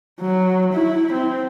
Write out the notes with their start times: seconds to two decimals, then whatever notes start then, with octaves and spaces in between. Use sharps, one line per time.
0.21 F#3
0.73 E4
1.13 C4